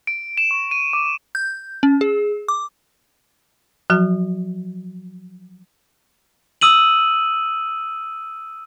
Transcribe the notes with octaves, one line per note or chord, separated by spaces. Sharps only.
D7
E7
C#6
D#7
D6
G6
C#4
G#4
D6
F3 F#3 F#4
D#6 E6 D#7 F#7